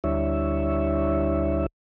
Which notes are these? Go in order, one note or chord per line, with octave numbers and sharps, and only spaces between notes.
D2 G3 D4 E4 C#5 E5